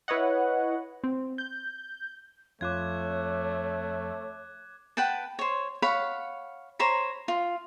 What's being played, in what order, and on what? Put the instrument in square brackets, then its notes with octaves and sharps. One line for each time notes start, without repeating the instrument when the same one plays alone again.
[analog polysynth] E4 B4 C#5 D#5 F#5
C4
G6
[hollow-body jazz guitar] F2 F4 [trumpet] A3 [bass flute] C#5 [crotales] D6 F#6 G#6
[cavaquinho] B4 F#5 G5 A5
C5 C#5
C#5 F5 F#5 B5
C5 C#5 A#5 B5
F4